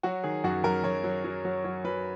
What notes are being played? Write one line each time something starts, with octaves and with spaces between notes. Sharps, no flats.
F#3 F#4
D#3 G#4
F#2 F#4
F#2 A#4
F#2 C#5
F#3
F#3
F#3
F#3 C#5
F#3 B4